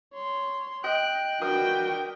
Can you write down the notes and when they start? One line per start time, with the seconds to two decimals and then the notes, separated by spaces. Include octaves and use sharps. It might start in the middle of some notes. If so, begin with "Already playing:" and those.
0.14 C#5 C6
0.84 D#5 G5 F#6
1.42 D4 F#4 A#4 B4 G5 D#6